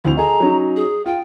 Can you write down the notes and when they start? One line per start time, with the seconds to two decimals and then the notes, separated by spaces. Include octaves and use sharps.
0.05 D2 C4 E4 F7
0.17 G#4 A4 D#5 A#5
0.40 F#3 C#4 D#4
0.76 G#4
1.06 F4 G5